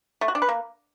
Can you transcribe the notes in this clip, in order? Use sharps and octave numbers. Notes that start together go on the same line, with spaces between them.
A3
F#4
D4
B4
A#3